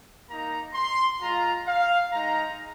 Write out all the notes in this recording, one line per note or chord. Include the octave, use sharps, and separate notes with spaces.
A#3 D#4 A#5
C6
G#3 F4 A#5
F5
G#3 D#4 A#5